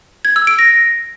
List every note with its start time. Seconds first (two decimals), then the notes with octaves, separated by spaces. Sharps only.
0.25 G#6
0.36 E6
0.47 D7
0.59 A#6